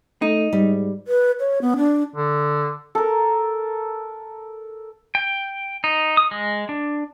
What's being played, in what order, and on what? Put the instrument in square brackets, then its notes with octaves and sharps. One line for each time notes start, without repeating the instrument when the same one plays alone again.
[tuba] A3 [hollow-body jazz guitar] D#4
[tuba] G#2 [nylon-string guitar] G3
[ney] B4
C#5
B3
D4
[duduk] D3
[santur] A4 A#4
[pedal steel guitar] G5
D#4
D#6
G#3
D4